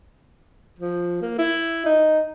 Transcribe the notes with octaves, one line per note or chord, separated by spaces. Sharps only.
F3
A#3
E4
D#4